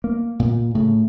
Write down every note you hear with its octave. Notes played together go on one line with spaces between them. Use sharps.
A#3
A#2
A2 C#3